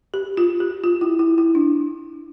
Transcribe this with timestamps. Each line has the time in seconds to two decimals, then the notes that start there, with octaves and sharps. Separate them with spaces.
0.14 G4
0.37 F4
0.60 G4
0.84 F4
1.01 E4
1.19 E4
1.38 E4
1.55 D4